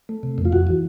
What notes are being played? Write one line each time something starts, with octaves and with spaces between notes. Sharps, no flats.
A3
C3
F2
F4
F2 F#4
E3